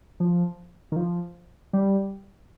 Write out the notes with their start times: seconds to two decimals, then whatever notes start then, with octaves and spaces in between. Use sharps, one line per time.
0.20 F3
0.92 D#3
0.96 F3
1.73 G3